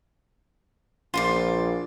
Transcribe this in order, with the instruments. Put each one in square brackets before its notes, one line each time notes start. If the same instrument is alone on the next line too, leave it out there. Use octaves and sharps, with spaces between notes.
[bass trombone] A#1 [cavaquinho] F4 C5 D5